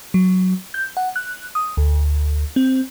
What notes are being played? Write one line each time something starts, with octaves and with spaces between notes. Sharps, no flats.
F#3
G6
F#5
F#6
D#6
D2
C4